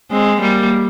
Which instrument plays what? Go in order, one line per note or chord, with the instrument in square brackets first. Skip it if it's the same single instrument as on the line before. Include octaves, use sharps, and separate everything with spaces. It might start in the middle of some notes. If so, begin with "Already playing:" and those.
[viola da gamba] G#3 C4
G3 A#3